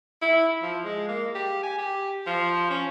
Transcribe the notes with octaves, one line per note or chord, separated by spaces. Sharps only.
E4
F3
G#3
A#3
G4
G#5
G4
F3
C#4